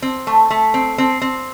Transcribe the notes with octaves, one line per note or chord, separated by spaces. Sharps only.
C4
A3
A3
C4
C4
C4